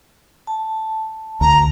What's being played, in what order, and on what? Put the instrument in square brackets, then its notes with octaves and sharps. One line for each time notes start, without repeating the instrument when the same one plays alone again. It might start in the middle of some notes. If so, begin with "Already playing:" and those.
[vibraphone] A5
[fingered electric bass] D2 [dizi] A#5